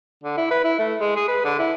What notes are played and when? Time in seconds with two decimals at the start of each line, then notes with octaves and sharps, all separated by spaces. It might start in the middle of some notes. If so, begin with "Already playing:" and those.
0.24 D3
0.37 E4
0.51 B4
0.64 E4
0.79 A3
1.01 G#3
1.16 G#4
1.28 B4
1.45 D3
1.59 E4